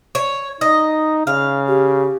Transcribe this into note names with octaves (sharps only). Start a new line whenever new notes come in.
C#5
D#4 D#5
C#3 F5
G4